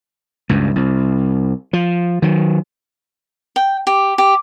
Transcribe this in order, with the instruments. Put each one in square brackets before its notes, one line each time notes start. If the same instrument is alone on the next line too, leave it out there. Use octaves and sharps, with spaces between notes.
[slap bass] C#2 G2
C2
F3
D#3 F#3
[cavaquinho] G5
G4
G4